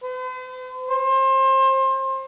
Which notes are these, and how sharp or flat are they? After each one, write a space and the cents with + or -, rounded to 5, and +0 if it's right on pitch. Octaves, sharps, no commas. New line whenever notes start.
C5 -45
C5 +30